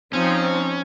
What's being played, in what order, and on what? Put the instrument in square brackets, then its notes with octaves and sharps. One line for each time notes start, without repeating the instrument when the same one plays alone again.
[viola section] F3 C4 D#4 [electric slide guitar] C#4